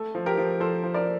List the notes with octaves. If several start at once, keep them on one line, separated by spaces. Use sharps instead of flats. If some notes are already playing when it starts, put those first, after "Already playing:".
Already playing: A3 A4
F3
G4 A#4
F3
F3 A4 C5
F3
A#4 D5